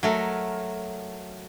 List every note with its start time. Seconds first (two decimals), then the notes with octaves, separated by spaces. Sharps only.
0.03 F#3 A3 A#4